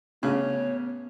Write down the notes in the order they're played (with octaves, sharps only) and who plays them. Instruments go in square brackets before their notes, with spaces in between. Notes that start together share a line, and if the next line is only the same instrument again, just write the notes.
[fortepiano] A1 C#3 [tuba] B3 [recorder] C#5